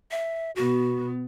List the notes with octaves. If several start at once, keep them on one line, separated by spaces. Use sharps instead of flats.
E5
B2 B3 F#4